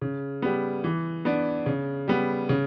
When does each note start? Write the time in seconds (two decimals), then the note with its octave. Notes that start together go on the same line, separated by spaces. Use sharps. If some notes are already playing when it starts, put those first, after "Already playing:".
0.01 C#3
0.42 G3 B3
0.84 E3
1.25 B3 D4
1.66 C#3
2.08 G3 B3
2.49 C#3